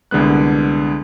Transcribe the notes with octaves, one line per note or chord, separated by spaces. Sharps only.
C2 D3 G#3 B3 F#6